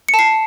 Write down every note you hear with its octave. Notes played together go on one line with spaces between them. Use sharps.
C#7
A5
C7